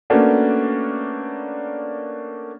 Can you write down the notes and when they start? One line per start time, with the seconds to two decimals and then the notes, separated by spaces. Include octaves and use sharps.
0.10 A3 A#3 C#4 D4 F#4 B4